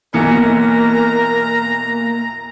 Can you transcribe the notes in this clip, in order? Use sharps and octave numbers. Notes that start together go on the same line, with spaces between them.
B1 E3 A#3 A#4 A#5 C#7